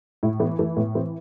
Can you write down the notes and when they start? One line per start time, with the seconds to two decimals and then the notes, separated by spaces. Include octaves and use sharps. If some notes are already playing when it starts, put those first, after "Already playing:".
0.23 A2 E4
0.40 E3 B3
0.59 E3 A3
0.76 A2 B3
0.95 E3 C4